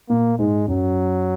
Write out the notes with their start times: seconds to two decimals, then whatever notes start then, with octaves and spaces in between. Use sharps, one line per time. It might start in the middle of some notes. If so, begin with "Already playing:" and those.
0.09 A#2 A#3
0.38 G#2 G#3
0.68 F#2 F#3